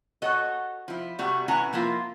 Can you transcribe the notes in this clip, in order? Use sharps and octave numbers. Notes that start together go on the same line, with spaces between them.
F#4 A4 C#5 D#5
F3 E4
C3 G3 A3 F#4
A2 E3 C#4 F#5 G#5 A#5
F3 A#3 E4 F4